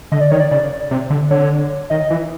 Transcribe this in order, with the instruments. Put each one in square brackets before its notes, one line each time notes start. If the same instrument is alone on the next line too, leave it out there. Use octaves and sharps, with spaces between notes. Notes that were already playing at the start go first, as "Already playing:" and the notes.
[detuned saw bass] D3 [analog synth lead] D#5
[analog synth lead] D5
[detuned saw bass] D#3 [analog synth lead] C#5
[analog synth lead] D5
[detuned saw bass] C#3
C3
D3
[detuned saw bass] D3 [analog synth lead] C#5
[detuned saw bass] D#3 [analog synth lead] D#5
[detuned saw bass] E3